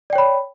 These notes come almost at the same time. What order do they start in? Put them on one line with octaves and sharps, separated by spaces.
D5 G5 C#5 B5